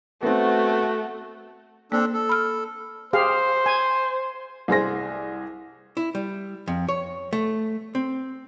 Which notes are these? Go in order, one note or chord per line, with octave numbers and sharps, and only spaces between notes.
A3 B3 C4 F#4
A#3 C4 D4 A4
A4
B5 F6
G4 G#4 C5 F5
G#5
C2 G#4 C5 A#6
E4
G3
F2
C#5
A3
C4